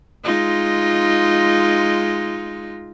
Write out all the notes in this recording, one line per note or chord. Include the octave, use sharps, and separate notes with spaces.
G#3 D#4 F4